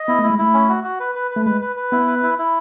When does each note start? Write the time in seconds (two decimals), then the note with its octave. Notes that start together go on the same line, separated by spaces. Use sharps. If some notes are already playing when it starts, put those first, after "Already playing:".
Already playing: D#5
0.08 B3 E4
0.19 A3 E4
0.30 G#3
0.38 A3 E4
0.54 C#4
0.69 F#4
0.84 F#4
1.00 B4
1.15 B4
1.31 B4
1.36 A3
1.46 G#3 B4
1.61 B4
1.76 B4
1.92 B3 E4
2.07 B4
2.23 E4
2.39 E4